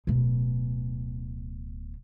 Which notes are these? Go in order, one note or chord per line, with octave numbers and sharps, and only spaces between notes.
D1 B2